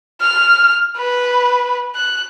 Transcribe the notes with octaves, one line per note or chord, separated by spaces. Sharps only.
F6
B4
F#6